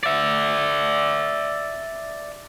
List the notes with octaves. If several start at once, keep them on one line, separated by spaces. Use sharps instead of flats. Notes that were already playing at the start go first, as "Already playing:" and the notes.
D5 E5